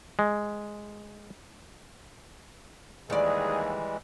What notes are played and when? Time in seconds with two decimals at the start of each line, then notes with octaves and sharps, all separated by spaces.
0.19 G#3
3.10 D#2 D#3 E3 G3 G#3 G#4 D5